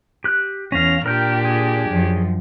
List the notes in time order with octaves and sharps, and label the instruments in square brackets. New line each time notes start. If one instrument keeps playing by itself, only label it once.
[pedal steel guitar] G4 F#6
[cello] E2 [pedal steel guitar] C#4 F5 [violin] A#6 F7
[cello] A#2 [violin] D4 G4 [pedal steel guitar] A#4 G5
[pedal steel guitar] G#4
[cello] F#2 F3